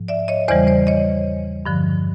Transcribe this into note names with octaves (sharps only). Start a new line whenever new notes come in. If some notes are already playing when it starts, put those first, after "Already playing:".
Already playing: G#2 F3
D5 E5
C#5 D#5
E2 C#3 E3 G3 C5 D5
C5 D5
C#5 D#5
G2 D3 F3